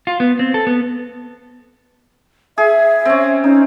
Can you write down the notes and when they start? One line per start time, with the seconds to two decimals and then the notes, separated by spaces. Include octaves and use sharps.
0.07 F4
0.20 B3
0.39 C4
0.54 A4
0.67 B3
2.58 G#4 E5
3.05 C4 C#4
3.44 C#4 D#4